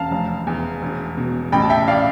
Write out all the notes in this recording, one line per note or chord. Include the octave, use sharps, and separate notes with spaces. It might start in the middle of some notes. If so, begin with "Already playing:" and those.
Already playing: E1 F5 A5
F1
E2
E1
B2
A1 G5 B5
A5
E5 G5
D5 F5